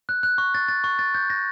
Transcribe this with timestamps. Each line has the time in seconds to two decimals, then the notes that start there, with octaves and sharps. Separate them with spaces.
0.09 F#6
0.23 F#6
0.38 C#6
0.54 A6
0.68 A6
0.84 C#6
0.99 A6
1.14 G6
1.30 A#6